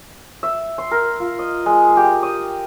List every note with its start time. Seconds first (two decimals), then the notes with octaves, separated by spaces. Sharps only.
0.43 E5
0.78 C6
0.91 A#4
1.20 F4
1.39 D#5
1.66 G#3
1.97 G4
2.23 D#6